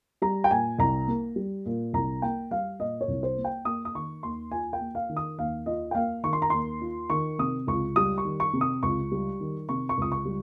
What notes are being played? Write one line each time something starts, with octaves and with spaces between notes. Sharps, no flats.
G3 A#5
G5
A#2 G#5
C2 A#5
A#3
G3
A#2
C2 A#5
A#3 G5
G3 F5
A#2 D#5
C#5
C2
C5
A#3
G5
A#3 D#6
D#6
D#3 C#6
D#2 C6
F4 G#5
G5
A#3
F5
D#3
D#6
D#2 F5
F4 D#5
G5
A#3 F5
D#3 C#6
C6
A#5
D#2 C6
F4
D#3 C#6
C3 D#6
C#2 C#6
G3 D#6
C#6
D#3
C#6
C3
D#6
C#2 C#6
G3
D#3
C3 C#6
C#6
C#2 D#6
C#6
G3